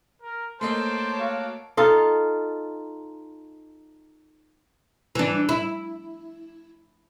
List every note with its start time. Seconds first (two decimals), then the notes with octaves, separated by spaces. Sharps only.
0.22 A#4
0.61 A3 A#3 C5 C#5 D#5 A5 C6 D6
1.19 F#4 F5
1.77 D#4 F4 A4
5.15 E3 D4
5.49 E4